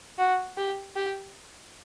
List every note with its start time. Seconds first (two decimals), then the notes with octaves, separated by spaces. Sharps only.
0.18 F#4
0.57 G4
0.96 G4